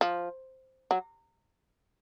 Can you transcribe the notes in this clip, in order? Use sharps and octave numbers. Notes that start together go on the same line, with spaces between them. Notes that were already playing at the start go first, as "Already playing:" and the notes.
F3
F#3